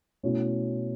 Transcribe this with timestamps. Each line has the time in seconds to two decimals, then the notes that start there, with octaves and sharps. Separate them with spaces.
0.23 B2 A3 C#4 E4